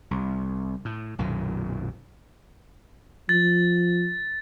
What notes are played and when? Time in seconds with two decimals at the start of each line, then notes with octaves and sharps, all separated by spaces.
0.11 C2
0.85 A2
1.19 B1 F#2 A#2 D#3
3.29 F3 A6